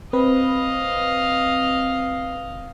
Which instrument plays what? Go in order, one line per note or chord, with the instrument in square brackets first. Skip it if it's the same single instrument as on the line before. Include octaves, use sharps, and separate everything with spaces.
[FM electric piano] C4 B4 [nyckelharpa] D#5 F5